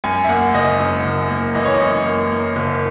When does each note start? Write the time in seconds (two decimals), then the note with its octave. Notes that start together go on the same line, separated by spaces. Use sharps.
0.04 F#2 G#5
0.25 E5
0.29 A#3 F#5
0.54 F#1 D#5
0.79 F#2
1.05 F#1
1.30 A#3
1.55 E3 D#5
1.65 C#5
1.74 D#5
1.81 F#2
2.06 A#3
2.31 A#3
2.56 F#1